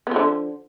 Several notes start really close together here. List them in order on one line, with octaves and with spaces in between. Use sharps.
B3 F3 D3